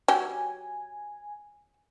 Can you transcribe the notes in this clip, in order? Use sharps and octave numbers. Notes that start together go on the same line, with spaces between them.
F#3 G4 G#5